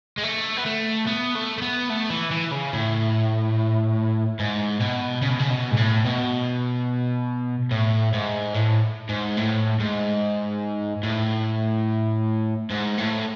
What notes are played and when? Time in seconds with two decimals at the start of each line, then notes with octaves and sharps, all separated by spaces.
0.18 G#3
0.23 A3
0.56 B3
0.66 A3
1.07 B3
1.35 A3
1.58 A3
1.62 B3
1.90 A3
2.10 E3
2.31 E3
2.52 C#3
2.73 A2
4.39 G#2
4.80 B2
5.22 C#3
5.30 B2
5.39 C#3
5.50 B2
5.71 G#2
5.77 A2
6.05 B2
7.71 A2
8.13 G#2
8.54 A2
9.09 G#2
9.38 A2
9.80 G#2
11.03 A2
12.70 G#2
12.97 A2